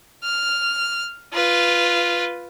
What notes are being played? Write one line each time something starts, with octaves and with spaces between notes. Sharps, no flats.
F6
F4 B4